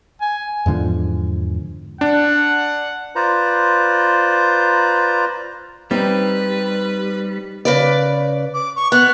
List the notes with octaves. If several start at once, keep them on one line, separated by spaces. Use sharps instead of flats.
G#5
E2 G#2 D3 F3
D4 F#5
F4 B4 C5 D5 A#5
G3 C4 D#4 B4 G5
C#3 B4 D5
D6
C#6
B3 F#6